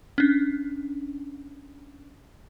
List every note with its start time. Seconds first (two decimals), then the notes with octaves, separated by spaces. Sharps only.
0.18 C#4 D4